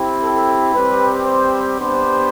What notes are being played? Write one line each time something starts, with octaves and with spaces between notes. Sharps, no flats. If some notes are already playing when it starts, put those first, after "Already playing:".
Already playing: C4 E4 G4
A4
G3 C4 G4 B4
C5
B3 D4 G4 C5